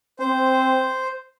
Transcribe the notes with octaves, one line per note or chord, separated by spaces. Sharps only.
C4 C5